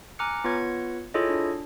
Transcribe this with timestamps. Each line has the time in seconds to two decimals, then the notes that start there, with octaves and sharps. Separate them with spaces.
0.19 G#5 A#5 D6 F6 F#6 C#7
0.44 B3 F4 B4 C#5 G#6 C#7
1.14 E4 F4 G#4 A4 C#5 D#5
1.29 D4